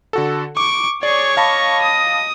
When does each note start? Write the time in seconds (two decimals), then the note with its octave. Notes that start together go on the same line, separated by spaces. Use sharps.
0.13 D3 F#4 A4
0.57 C#6 D6 D7
1.03 G#4 C#5 D5 C#6
1.37 D#5 F5 A5 B5
1.82 D#6